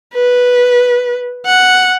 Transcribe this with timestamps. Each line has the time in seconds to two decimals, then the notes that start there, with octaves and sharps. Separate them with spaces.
0.14 B4
1.46 F#5